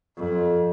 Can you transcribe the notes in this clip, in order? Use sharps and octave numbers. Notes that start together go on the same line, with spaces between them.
F2